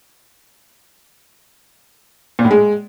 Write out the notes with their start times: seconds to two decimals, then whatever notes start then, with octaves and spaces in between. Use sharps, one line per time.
2.39 A#2
2.45 A2
2.51 G#3